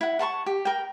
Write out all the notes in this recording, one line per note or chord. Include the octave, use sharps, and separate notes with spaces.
E4 F#5
F#5 A5 C6 C#6
G4
A#4 G5